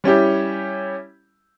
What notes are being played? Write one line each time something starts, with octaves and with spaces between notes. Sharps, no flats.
G3 C#4 E4 G4